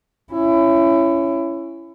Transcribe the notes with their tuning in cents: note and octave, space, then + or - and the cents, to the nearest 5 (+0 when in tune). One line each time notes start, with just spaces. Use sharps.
C#4 +0 E4 +25